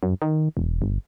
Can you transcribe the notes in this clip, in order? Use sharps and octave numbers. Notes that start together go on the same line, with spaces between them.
F#2
D#3
E1
G1